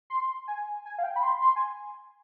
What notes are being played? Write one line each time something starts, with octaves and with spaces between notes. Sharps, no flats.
C6
G#5
G#5
F5
G5
B5
C6
C6
G#5